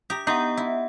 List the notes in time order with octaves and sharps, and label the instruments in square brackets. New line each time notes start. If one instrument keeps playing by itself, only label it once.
[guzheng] G4 A#5 [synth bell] D#6
[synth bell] B3 G4 F#5 [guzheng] D#4
[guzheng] E4